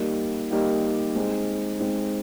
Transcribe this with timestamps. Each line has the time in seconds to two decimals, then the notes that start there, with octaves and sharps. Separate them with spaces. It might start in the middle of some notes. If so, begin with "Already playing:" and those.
Already playing: G3 A#3 D#4 G4
0.51 G3 A#3 D#4 G4
1.15 G#3 C4 D#4
1.80 G#3 C4 D#4